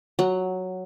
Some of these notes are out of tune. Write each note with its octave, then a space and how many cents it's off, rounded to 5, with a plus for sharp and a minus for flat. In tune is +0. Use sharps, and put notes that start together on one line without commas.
F#3 +0 F#5 +10